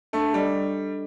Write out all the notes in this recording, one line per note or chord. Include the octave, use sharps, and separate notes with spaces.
A3 D4
G3 A4 D#5